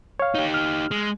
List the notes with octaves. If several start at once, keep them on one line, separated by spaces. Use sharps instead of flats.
C#5 F5
D#4 G4
F6
G#3